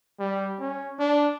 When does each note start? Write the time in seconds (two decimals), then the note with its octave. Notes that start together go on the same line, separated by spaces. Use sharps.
0.20 G3
0.60 C#4
0.99 D4